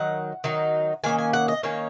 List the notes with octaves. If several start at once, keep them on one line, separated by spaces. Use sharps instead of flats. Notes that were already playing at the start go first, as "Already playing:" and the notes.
Already playing: D#3 F#3 D#4 F#5
D#3 F#3 D#4
D#3 A#3 C#4 G#5
G#5
F#5
D#5
D#3 A#3 C#4 C#5